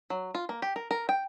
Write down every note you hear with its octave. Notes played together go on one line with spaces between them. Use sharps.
F#3
F4
A#3
G4
A#4
A#4
G5